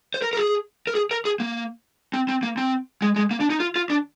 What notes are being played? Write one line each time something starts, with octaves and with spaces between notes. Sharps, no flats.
C5
A#4
A#4
G#4
A#4
G#4
A#4
G#4
A#3
C4
C4
A#3
C4
G#3
G#3
A#3
D4
D#4
F4
F4
D4